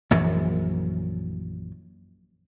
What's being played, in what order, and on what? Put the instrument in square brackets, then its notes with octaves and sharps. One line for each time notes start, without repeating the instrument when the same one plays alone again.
[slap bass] A#1 F#2 E3 F#3